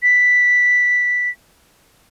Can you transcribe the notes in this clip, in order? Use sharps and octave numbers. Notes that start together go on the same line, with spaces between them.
B6